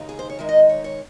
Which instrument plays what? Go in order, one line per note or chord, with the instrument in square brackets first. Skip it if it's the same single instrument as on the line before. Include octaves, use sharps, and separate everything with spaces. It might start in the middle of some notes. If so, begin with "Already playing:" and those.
Already playing: [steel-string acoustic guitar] D#2 C#3 G#3 D#4
G#4
C5
C#5
D#3 G#3 D#4 E5
D#5
C#5
C#5